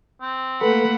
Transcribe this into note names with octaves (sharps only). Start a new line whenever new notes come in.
C4
A3 A#3 A4 B4 F#5 B5